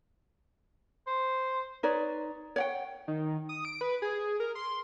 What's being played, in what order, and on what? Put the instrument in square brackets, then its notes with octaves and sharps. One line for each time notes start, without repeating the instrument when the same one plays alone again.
[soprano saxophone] C5
[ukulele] D#4 B4 C#5 D5
C#5 F#5 G5
[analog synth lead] D#3
D#6
D7
B4
G#4
A#4
C6